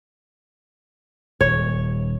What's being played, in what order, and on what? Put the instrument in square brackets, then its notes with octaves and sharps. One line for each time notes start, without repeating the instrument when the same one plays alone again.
[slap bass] D#1 [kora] C#5